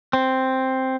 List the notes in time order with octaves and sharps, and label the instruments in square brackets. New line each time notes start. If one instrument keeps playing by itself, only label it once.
[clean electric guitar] C4